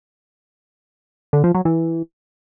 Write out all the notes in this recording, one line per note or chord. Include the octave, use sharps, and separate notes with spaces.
D3
F3
F#3
E3